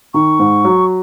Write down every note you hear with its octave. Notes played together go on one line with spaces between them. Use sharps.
D#3 C#6
G#2
F#3